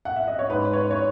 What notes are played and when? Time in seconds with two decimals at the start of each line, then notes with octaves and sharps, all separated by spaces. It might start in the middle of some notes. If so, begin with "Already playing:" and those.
0.05 F#5
0.16 E5
0.28 D#5
0.39 C#5
0.50 G#2 B4
0.73 C#5
0.91 C#5